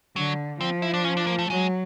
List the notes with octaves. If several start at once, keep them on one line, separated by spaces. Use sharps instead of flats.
D3 F#3
F3 C4
E4
D4
C#4
D4
A#3
A3
F#3 G#3